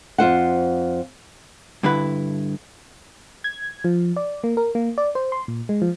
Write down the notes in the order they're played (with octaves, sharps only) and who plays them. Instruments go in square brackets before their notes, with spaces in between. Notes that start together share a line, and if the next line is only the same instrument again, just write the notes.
[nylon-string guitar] F2 F4 C5 F#5
[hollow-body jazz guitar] G2 D3 E4 B4
[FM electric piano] G#6
F3
D5
A#3
A#4
A#3
D5
C5
C6
A#2
G#3
F3